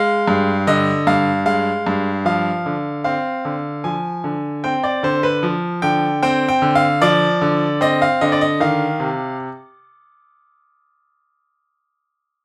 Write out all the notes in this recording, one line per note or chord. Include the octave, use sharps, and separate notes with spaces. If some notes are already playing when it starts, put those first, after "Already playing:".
Already playing: G#3 F5
G2
D3 D#5
G2 F5
G#3 F5
G2
F3 F5
D3
C4 F5
D3
F3 G#5
D3
C4 G5
D5
D3 C5
B4
F3
D3 G5
C4 G5
G5
D3
F5
F3 D5
D3
C4 D#5
F5
D3 D#5
D5
D#5
D#3 F5
C3